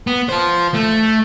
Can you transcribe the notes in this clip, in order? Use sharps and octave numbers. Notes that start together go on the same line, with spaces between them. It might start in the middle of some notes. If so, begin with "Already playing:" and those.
B3
F4 C5
A3